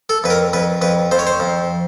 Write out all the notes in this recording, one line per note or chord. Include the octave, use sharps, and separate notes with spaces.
A4
F2 B4
A#4
F2 B4
F2 B4
F2 C5
C#5
C5
F2